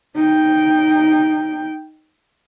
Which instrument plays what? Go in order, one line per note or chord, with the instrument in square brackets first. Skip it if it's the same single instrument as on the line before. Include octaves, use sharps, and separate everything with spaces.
[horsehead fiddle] D#4 G5